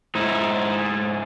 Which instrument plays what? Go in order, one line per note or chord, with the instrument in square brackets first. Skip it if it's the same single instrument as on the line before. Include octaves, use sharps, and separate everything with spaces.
[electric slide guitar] G#2 D#4 E4